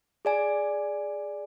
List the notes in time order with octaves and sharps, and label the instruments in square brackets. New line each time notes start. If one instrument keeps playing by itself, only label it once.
[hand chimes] G#4 D5 G#5